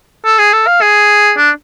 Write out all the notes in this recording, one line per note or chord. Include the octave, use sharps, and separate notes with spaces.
A4
G#4
A4
F5
G#4
D4